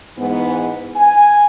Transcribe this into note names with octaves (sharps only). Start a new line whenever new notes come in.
G#2 E3 B3
G#5